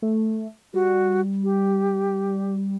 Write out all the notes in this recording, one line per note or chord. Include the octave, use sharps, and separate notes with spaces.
A3
G3 F#4
G4